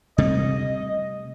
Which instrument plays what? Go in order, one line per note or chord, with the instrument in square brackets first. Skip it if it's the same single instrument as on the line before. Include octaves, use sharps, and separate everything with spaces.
[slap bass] C3 G3 A3 [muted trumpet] D#5